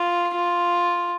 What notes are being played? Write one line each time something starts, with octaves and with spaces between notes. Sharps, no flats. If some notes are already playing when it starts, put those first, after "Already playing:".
Already playing: F4
F4